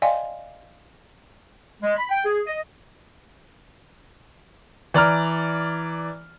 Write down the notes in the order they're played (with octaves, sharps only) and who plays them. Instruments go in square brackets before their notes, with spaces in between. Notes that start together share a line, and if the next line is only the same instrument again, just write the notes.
[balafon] D5 D#5 F5 G5 G#5 C6
[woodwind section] G#3
B5
G5
G#4
D#5
[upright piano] E3 D5 A#5 F6